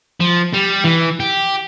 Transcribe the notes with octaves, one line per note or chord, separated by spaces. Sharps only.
F3
G3
E3
G4